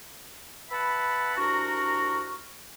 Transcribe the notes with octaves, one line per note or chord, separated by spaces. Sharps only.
B4 E5 F#5 A5 B5
C2 D4 F#4 A#4 A#5 C#6